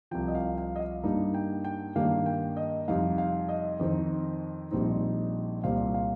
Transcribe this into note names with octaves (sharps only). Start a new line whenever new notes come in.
C2 C3 F3 G5
D#5
F5
F5
D#5
F5
G2 G3 A#3 D#4
G5
G5
G2 D#3 G3 A#3 F5
G5
D#5
F2 C3 G3 D#4 F5
F5
D#5
F2 D#3 C4 D#4
A#1 A#2 G3 C4 D#4
C2 A#2 G3 C4 F5
F5